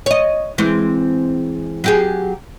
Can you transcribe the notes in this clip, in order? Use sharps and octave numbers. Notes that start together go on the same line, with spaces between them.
C#5 D#5
E3 G#3 C4
F#3 G4 G#4